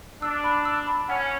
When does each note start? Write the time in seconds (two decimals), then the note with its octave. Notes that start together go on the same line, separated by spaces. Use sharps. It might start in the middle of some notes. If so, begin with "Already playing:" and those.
0.22 D4 E6
0.44 B5
0.65 E6
0.87 B5
1.08 C#4 F#5